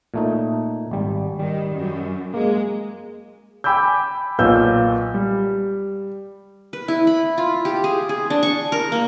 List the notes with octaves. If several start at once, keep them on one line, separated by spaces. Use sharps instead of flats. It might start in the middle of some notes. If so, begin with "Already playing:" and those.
A#2 A3 D#4
G#1 G3
D#3 G3
F#2
G#3 A#3
G5 G#5 B5 D6 E6 G6
B1 A#2 B3 F4 E6 G6
G3
B4
E4
B5
F4
G4
G#4
G#4
D4
C#6
A#4
A#3